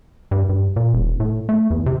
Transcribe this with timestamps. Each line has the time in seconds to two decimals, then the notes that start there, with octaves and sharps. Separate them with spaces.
0.31 G2
0.49 G2
0.76 A#2
0.94 E1
1.20 A2
1.49 A3
1.70 E2
1.86 C3